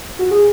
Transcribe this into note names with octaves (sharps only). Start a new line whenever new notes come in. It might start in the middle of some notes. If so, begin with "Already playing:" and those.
F#4
G#4